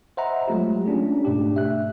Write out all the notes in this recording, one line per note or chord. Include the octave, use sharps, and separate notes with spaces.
C5 D#5 E5 F#5 A#5 B5
F#3 G#3 A3 F4 G4
C#4 D4 F4 G#4
G#2 B2 A3 D4 G4
E5 F#6